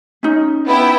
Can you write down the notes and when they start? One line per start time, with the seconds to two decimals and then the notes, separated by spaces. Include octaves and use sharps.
0.23 C#4 D#4
0.67 B3 E4 G5